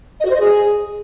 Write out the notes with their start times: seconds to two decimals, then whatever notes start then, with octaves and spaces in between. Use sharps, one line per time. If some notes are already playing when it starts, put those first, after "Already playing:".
0.19 D#5
0.24 F#4
0.30 C5
0.35 D#5
0.40 G#4